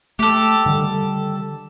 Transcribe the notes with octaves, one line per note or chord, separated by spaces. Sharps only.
A3 G4 A4
D3 D#3 G3